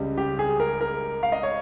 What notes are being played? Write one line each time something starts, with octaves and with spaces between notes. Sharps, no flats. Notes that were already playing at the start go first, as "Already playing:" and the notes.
Already playing: C#2 C#3 G3
G4
G#4
A#4
A#4
F5
D#5
C#5